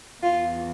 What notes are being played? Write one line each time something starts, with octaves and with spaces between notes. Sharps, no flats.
E2 E3 F4